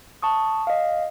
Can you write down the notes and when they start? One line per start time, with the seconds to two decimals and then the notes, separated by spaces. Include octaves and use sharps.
0.22 A5 C#6 D#6
0.67 D#5 F5